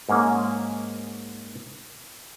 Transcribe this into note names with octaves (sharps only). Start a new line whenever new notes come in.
G#2 G#3 A#3 C#4